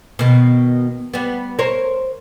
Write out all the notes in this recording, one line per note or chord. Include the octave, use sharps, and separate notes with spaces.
B2 D#3 B3
G3 B3
A#4 C5 C#5